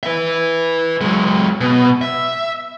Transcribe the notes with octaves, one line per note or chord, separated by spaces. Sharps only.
B4 E5
F#3 G#3
B2
E5